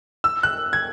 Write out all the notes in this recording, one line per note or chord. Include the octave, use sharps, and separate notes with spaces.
E6
F#6
G#6